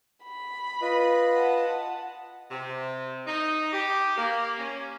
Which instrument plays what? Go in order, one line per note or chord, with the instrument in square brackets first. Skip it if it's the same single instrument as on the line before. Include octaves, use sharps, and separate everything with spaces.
[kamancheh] B5
[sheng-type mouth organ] F4 B4 D#5
[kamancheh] F#5 A5
[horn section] C3
D#4
G4
A#3
C#4